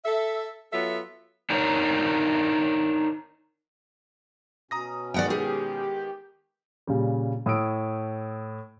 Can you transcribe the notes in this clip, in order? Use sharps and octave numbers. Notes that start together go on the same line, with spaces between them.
A4 E5
F#3 B3 F4 A4 E5
D4 D#4 A#4 C5 C#5
B2 C#4 A#5 D#6 A#6
D#3 G#3 B3 D5 F#5 G5
G4 G#4
A#2 C#3 G3
A2 D#6 E6 D7